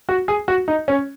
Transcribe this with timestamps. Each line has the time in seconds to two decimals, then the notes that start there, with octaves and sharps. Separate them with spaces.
0.09 F#4
0.28 G#4
0.48 F#4
0.68 D#4
0.88 C#4